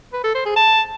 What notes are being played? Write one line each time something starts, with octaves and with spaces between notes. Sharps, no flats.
B4
A4
C5
G#4
A5